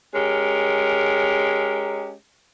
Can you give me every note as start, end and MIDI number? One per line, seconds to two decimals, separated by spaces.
0.14 2.13 56
0.14 2.13 61
0.14 2.13 67
0.14 2.13 70